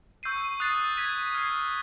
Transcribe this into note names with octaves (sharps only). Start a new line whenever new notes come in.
C#6 E6 G6 C7 D#7
D#6 F#6 A6 C7
G#6 B6 D#7
F6 G#6 C7